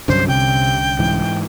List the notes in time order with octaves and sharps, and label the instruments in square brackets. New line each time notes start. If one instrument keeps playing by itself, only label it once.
[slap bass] C2 D3 C#4 [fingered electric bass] G2 F#3 [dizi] C5
[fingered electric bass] C3 [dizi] G5
[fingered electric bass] G#2 E3